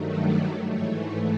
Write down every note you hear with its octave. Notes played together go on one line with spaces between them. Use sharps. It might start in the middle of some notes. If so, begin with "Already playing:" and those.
Already playing: G2 D#3 F#3 A3
D5
G#2 E3 A3 C#5